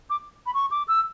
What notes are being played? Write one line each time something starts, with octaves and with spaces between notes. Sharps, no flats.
D6
B5
C#6
D6
E6